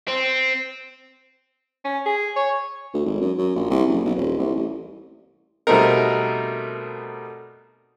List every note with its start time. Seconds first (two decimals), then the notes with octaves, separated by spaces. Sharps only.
0.08 C4
1.85 C#4
2.06 G#4
2.36 C#5
2.94 D2
3.06 G#1
3.21 F#2
3.38 F#2
3.56 A#1
3.70 C2
3.89 F#1
4.05 B1
4.16 D#1
4.38 C2
4.55 A1
5.67 B2 G3 A3 C4 D#4 A#4